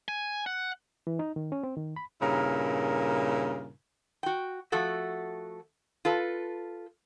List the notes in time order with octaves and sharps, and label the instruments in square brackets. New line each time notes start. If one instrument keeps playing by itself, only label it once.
[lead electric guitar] G#5
F#5
[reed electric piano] E3
D#4
D#3
C#4
C4
D#3
B5
[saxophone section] G2 A#2 C#3 E4 A#4
[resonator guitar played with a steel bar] F#4 G5
F3 A3 F#4 A4 F#5
F4 A4 B4